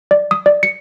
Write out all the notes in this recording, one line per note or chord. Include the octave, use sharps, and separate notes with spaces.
D5
D#6
D5
C#7